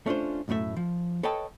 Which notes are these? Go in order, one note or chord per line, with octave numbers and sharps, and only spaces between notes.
A3 C#4 D4 F4 C5
B1 F#2 A2 A3 E5
F3
A4 B4 C#5 D#5 G5 A5